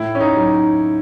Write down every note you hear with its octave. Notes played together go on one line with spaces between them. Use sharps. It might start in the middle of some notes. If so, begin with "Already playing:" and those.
Already playing: A2 E4
C#4
D#4
F#3